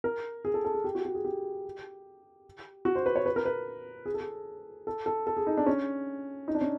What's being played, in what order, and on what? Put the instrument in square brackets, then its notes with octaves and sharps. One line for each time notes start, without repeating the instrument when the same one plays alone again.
[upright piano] A#4
G#4
A4
A4
G#4
G4
F#4
F#4
G#4
G4
F#4
C5
B4
C#5
B4
A#4
B4
G#4
A4
G#4
A4
A4
A4
G#4
D#4
D4
C#4
D#4
D4
C#4